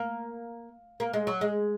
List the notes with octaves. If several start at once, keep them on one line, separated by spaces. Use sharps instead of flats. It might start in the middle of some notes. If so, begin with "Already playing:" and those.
Already playing: A#3
A#3
G#3
F#3
G#3